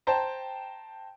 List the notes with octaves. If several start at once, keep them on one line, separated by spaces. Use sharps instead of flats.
C5 G5 A5 A#5